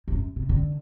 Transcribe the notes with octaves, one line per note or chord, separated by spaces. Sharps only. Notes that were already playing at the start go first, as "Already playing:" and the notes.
E2
F#2
C3
D3